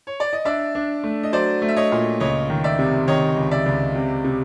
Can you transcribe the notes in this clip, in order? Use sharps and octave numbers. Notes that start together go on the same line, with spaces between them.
C#5
D5
D#5
D4 D5 E5
D4
A3
D#5
F#3 C5 D5
A3
E5
C#5 D#5
A#2
C#2 C#5 D#5
D#3
D5 E5
C3
D#3 C#5 D#5
C#2
D5 E5
C#2
C3
C3